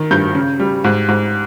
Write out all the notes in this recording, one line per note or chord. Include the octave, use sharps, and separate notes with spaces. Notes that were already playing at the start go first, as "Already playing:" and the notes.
Already playing: D#3
G2 G6
C#3
G3
G#2
G#2